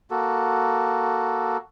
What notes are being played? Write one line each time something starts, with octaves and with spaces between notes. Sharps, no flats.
A#3 F#4 A4